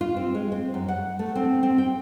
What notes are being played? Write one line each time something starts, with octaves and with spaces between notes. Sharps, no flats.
F4
C4
G#3
C4
F#2
F#5
A3
C4
C4
G5